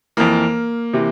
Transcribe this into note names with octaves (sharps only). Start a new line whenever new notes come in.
F2 E3 A#3
C3 E3